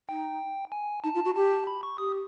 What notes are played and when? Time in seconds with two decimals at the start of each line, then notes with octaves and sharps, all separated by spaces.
0.09 D#4 G5
0.72 G#5
1.04 D#4 A5
1.14 F4
1.25 F#4
1.35 G4 A5
1.67 B5
1.83 C#6
1.98 G4 D#6